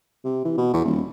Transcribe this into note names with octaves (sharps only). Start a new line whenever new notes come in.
C3
E3
B2
E2
D#1